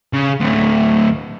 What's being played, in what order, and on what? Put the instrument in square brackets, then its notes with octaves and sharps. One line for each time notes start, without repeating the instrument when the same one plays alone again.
[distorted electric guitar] C#3
D2 A2